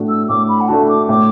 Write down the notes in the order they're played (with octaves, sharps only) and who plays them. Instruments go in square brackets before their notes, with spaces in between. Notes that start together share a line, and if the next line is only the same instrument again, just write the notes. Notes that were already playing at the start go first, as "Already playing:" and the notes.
Already playing: [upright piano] A2 A3 D4 F#4
[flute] E6
[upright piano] A2 [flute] D6
[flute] B5
F#5
[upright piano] A3 D4 F#4 [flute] A5
[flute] D6
[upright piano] A2 [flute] D6